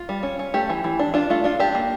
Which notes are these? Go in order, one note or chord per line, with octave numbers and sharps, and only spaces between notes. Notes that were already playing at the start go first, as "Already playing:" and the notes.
Already playing: F4
G3
C#4
C#4
A3 G4
E3
E3
D4
D4 F4
A3 F4
D4 F4
D4 G4
A#3